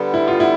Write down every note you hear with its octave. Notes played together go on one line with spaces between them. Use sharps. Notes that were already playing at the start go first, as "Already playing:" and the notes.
Already playing: D3 G3 B3
E4
F4
E4